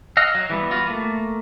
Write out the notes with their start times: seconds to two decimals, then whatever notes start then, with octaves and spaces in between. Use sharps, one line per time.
0.17 D#5 F5 F#5 E6
0.35 F#3
0.50 E3 G3 B3
0.71 F4 F#4 B4
0.87 A3 A#3